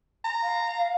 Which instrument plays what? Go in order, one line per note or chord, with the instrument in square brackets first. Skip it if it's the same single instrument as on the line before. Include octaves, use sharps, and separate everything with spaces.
[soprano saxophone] A#5
[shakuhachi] F5